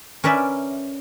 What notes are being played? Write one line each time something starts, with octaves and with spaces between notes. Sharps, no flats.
C#4 A#4 B4 D5 E5